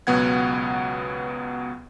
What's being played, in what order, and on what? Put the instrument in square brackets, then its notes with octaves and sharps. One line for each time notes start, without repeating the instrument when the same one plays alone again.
[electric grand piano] C#2 B2 F#3 B3 F#5 G#6